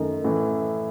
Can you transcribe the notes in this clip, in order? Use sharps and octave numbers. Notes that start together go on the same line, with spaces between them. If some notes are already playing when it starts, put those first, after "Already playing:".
Already playing: F#2 D#3 A3
A1 A2 E3